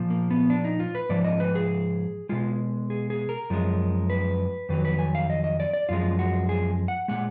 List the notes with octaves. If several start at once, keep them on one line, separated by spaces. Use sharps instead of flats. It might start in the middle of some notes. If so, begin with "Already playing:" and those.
Already playing: A#2 F3
A#3
B3
D4
D#4
F4
B4
G#2 F3 D5
D#5
B4
G#4
B2 G#3 F4
G#4
G#4
A#4
F#2 F3 G#3
B4
F2 D#3 F#3 B4
B4
G#5
F5
D#5
D#5
D5
D5
F#2 F3 G#3 F4
F#4
G#4
F#5
A#2 G#3 F#5